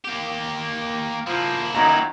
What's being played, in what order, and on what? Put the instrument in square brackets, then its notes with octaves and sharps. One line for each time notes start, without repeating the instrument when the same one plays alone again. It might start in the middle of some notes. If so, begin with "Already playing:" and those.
[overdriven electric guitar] A#3 G4
[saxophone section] F3 [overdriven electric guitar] A#3 E4
[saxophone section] F#2 D#3 [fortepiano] A#5